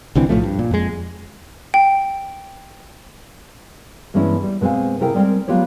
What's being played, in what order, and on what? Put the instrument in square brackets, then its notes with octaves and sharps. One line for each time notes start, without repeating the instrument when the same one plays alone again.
[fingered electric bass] C2 D3 E3 C4
B1 A2 F3 A3
G2
A#2
F2 G#3
[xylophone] G5
[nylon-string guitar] G2 E3 G#3 B3 C#4 E4
G3
B2 G#3 C4 F5 G#5
C3 E4 G#4 A#4 G5
G3 G#3 C4 A#4 G5
F#3 G#3 B3 F4 G4 C#5